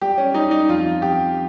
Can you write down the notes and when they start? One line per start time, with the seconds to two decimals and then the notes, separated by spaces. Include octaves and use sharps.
0.01 G3 G4
0.18 C#4
0.34 G3 D#4
0.51 D#4
0.69 F2 F4
1.02 F2 G4